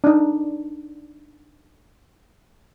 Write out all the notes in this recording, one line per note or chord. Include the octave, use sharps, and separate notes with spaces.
D4 D#4